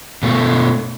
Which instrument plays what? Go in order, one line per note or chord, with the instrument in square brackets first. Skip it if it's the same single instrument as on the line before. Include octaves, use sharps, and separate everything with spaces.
[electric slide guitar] B2 A3